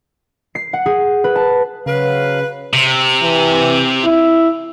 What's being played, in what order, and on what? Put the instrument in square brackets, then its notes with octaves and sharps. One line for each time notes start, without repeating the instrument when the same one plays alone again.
[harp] C7
F#5
G#4
B4
A5
[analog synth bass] C#3 [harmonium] F#3 F5 [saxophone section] B4
[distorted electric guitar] C3
[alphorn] E3
E4